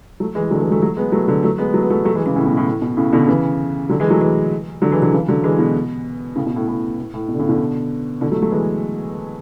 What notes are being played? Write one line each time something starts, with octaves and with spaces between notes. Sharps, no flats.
F#3 A3
E3 G#3
D3 F#3
A3
E3 G#3
F#3 A3
F#3 A3
G#3 B3
F#3 A3
D3 F#3
F#3 A3
G#3 B3
F#3 A3
B3
F#3 A3
F#3 A3
E3 G#3
C#3 E3
A2 C#3
B2
A2
A2
B2
A2 C#3
B2 D3
C#3 E3
D3 F#3
E3 G#3
F#3 A3
E3 G#3
D3 F#3
E3 G#3
D3 F#3
C#3 E3
D3 F#3
E3 G#3
B2
A2 C#3
B2
A2
A2
A2
A2
B2
D3
A2 C#3
B2 D3
B2 D3
F#3 A3
F#3 A3
E3 G#3